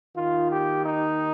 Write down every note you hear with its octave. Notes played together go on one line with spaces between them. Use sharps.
D#2 D#3 F4
G4
D#4